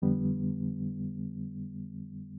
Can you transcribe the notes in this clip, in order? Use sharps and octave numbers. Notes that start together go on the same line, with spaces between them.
F2 D3 G3 B3